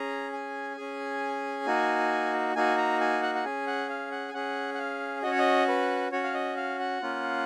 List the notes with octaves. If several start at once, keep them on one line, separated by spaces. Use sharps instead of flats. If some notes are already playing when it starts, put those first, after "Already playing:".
Already playing: C#4 G#4 A#5
G#5
C#4 G#4
A#3 D#4 F#4
A#3 D#4 F#4 G#5
A#5
G#5
F#5
F#5
C#4 G#4 G#5
F#5
F5
F#5
G#5
C#4 G#4 F#5
F#5
F5
C#4 F#4 D#5
C#5
D#5
B4
C#4 F#4 C#5
F5
D#5
F5
F#5
A#3 C#4 F4